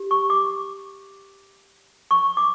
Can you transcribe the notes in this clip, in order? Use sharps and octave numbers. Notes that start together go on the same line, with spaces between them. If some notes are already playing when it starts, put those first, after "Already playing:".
Already playing: G4
C#6
D6
C#6
D6